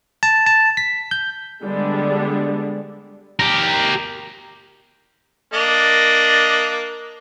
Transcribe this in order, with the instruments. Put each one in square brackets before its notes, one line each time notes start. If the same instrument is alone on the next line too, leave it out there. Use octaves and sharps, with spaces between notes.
[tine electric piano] A5
A5
B6
G6
[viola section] D3 G3 G#3 B3 D4
[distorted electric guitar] G4 A#4
[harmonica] A#3 D4 D#5